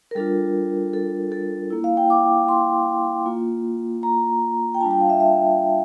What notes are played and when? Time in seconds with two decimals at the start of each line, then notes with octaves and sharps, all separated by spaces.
0.11 A#4
0.15 G3 D4 F4 A4
0.94 A4
1.32 A4
1.70 A#3 E4
1.84 F5
1.97 G5
2.10 D6
2.48 C6
3.26 A#3 F4
4.03 A#5
4.75 G5
4.81 G3 D4 F4 A5
4.91 G5
5.01 F5
5.10 E5
5.20 E5